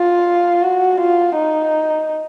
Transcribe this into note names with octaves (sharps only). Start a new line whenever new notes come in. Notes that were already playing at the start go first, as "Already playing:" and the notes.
Already playing: F4
F#4
F4
D#4